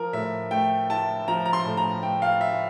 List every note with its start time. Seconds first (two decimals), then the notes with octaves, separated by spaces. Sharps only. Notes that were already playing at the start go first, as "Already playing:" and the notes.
Already playing: F3 A#4
0.13 A2 E5
0.51 A3 G5
0.90 E4 A5
1.28 F3 A#5
1.46 A#5
1.53 C6
1.65 A2
1.77 A#5
2.03 A3 G5
2.22 F5
2.41 E4 E5